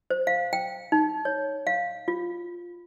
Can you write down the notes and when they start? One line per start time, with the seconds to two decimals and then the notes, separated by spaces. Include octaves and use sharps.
0.10 C5
0.27 F5
0.53 G5
0.92 D#4
1.25 C#5
1.67 F5
2.08 F4